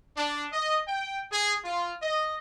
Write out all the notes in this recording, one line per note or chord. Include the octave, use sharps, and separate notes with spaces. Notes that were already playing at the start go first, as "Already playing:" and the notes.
D4
D#5
G5
G#4
F4
D#5